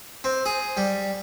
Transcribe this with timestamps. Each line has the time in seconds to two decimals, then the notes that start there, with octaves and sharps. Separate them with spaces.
0.24 C4
0.46 G#4
0.77 G3